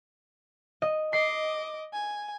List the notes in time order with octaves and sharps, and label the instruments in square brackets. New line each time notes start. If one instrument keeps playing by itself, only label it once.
[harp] D#5
[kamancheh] D#5 D6 [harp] C7
[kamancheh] G#5